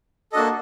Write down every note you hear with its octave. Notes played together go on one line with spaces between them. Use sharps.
A#3 D4 F#4 A4 D#5